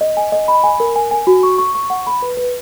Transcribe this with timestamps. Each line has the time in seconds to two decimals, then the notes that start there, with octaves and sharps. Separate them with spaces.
0.01 D#5
0.17 G#5
0.32 D#5
0.48 B5
0.64 G#5
0.80 A#4
0.96 G#5
1.11 G#5
1.27 F#4
1.43 C#6
1.58 C#6
1.75 C#6
1.90 F#5
2.07 B5
2.22 B4
2.37 B4